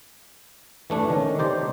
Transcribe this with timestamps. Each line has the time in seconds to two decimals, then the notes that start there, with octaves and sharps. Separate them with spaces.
0.90 E3 A3 D4
1.10 D#3 C#4
1.39 D#4 G4 C5 D5